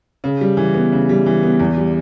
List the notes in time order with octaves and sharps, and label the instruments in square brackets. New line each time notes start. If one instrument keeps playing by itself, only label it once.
[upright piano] C#3
G3
E3
B3
C#3
G3
E3
B3
E2
G3